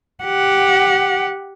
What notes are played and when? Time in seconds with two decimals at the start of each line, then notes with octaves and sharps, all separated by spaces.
0.24 G4 F#5